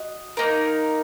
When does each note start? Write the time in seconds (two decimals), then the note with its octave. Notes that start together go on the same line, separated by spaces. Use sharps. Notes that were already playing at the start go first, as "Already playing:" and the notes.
Already playing: F#4 D#5
0.37 A#3 D#4 A#4